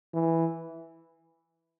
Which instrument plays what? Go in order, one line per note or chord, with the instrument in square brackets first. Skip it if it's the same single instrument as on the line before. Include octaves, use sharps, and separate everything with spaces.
[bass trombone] E3